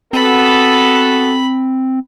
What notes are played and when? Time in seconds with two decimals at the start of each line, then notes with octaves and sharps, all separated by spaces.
0.13 B3 C4 F#4 A4 B5